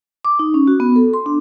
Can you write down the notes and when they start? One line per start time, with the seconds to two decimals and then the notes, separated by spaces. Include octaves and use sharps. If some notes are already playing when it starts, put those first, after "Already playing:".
0.25 D6
0.39 D#4
0.54 C#4
0.68 F#4
0.80 B3
0.96 A4
1.14 C6
1.26 D4